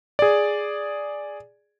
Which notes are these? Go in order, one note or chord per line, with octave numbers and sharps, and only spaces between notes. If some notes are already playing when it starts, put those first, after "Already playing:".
G#4 D5